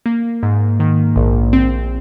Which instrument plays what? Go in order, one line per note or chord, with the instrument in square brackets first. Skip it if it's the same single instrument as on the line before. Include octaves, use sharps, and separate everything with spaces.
[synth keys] A#3
G#2
D#3
A#1
C4